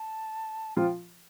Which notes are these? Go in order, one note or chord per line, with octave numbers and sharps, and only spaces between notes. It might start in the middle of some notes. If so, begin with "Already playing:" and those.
Already playing: A5
F3 F4 G5